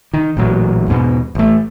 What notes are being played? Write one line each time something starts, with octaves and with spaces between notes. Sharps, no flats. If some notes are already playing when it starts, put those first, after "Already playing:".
D#3
A1 A#2 F#3
E2 G#2 B2
A1 A3